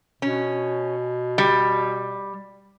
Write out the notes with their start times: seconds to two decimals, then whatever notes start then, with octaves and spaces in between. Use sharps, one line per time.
0.22 B2 C#4
1.38 G3